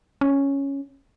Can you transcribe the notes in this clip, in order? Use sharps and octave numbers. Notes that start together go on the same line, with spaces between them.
C#4